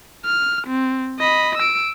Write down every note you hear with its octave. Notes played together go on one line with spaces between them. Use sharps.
F6
C4
D#5 B5
E6 D7